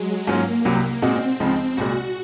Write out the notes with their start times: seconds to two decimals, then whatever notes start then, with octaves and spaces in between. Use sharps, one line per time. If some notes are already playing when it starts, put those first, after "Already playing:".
Already playing: F#3 G#3
0.27 G#2 F#3 A#3 C#4 F4
0.65 C2 C3 F#3
1.02 A#2 G#3 C4 D#4 F#4
1.40 C#2 C#3 F3 G#3 D#4
1.77 C2 A#2 G#3 F#4